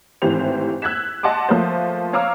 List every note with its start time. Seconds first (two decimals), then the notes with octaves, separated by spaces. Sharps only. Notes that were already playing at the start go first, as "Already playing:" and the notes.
0.22 G#1 A2 E3 G4 C5 F7
0.82 E6 F#6 G#6 B6 E7
1.23 D#5 F#5 A5 C6 D6
1.49 F3 A3 A#3 C5
2.13 C#5 F5 A#5 D6 E6 F6